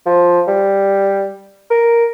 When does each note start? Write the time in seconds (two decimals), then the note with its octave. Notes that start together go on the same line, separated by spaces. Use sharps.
0.06 F3
0.47 G3
1.70 A#4